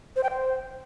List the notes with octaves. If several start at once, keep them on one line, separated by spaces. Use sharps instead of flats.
C5
G5
C5